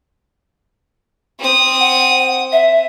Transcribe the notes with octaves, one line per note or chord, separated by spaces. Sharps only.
C4 D#6
F#5
E5